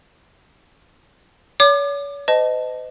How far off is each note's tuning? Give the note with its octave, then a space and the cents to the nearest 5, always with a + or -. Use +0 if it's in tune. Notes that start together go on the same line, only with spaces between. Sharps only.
C#5 +40 D6 +30
C5 -45 D#5 +0 A5 +0